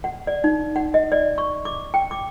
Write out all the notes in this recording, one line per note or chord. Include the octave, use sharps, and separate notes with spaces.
F#5
D5
D#4
F#5
D#5
D5
C#6
D6
G5
D6